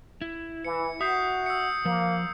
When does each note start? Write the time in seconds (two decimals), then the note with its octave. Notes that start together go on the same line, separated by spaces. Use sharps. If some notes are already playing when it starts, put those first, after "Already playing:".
0.21 E4
0.65 E3 C#7
1.01 F#4 E5 D#6 G6 C7
1.46 E6 C#7
1.85 F3 A#3